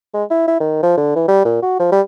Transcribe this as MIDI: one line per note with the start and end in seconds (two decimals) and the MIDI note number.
0.14 0.24 56
0.31 0.47 64
0.48 0.60 64
0.60 0.79 51
0.83 0.95 53
0.97 1.13 50
1.15 1.26 52
1.28 1.44 55
1.45 1.61 46
1.62 1.78 66
1.79 1.88 53
1.92 2.01 55